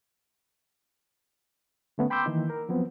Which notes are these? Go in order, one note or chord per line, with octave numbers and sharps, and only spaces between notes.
D3 A3 B3 C#4
G5 B5 C6 D6 E6 G6
D#3 E3 A#3 D#4
A#4
F3 F#3 B3 C4